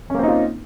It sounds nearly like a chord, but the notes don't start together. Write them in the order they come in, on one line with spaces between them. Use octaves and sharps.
C#4 A#3 C4 D#4 F4